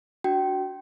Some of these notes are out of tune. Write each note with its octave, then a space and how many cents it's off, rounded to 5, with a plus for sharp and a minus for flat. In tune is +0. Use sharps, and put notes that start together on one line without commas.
D4 -5 F#4 +0 G5 -25